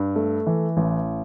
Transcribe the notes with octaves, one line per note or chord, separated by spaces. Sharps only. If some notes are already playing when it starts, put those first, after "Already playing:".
Already playing: G2
A3
E3
A1